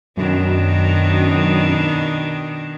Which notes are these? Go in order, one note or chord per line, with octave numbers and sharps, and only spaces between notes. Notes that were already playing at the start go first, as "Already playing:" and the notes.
F#2 B2 D#3 D4